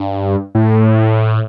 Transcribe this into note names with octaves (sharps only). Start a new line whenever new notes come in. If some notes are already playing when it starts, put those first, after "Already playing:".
Already playing: G2
A2